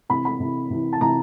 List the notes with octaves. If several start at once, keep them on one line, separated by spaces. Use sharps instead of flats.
C3 E3 B5
B5
C3 E3
C3 E3
A5
C3 E3 A#5